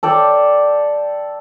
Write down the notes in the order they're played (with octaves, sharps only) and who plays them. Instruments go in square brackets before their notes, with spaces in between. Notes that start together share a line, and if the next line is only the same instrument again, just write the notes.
[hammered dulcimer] A4 D5 G5